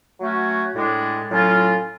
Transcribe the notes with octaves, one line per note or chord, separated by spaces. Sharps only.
F#3 A3 C#4 F#4
A2 G#3 D4
A2 F#3 C#4 F4